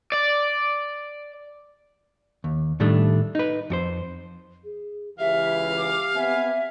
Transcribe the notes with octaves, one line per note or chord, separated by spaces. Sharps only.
D5
D#2
A2 D#3 G3 A3 D4
D#4 B4
F2 F#4 C5
G#4
C#2 E3 G4 E5 F5
D6
B3 C4 E5 G#5